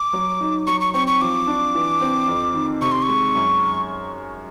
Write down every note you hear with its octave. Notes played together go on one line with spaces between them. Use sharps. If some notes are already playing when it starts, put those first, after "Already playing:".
Already playing: D6
F#3
D#4
F#3 C#6
C#6
C4 C#6
C#6
F3 D6
D4
E3
C4
F2
D#3
C3 C#6
C6
C#6
G#3
F#2